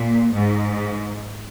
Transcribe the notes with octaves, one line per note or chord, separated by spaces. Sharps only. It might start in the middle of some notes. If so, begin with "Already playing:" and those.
Already playing: A#2
G#2